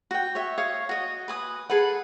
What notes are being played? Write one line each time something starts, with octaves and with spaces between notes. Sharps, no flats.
F#4 G5
C#5 E5
C#5 F5 D#6
F#4 D#5
B4 G#5 D#6
G#4 A4 B4 F#5